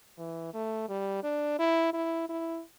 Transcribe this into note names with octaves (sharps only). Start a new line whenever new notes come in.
E3
A3
G3
D4
E4
E4
E4